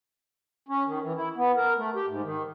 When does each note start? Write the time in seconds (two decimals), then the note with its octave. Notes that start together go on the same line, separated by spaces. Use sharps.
0.69 C#4
0.86 D#3
1.02 E3
1.16 E4
1.36 B3
1.56 A#4
1.78 A3
1.95 G4
2.07 G#2
2.24 D#3